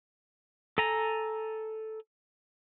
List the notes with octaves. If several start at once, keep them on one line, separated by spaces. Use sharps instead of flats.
A4 G#5 A#5